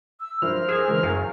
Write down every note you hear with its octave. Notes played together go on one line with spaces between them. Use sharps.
E6
G2 F3 E4 A#4 C5 F6
G#4 E6 G#6
C#3 E3 G#3
F#2 G#4 F5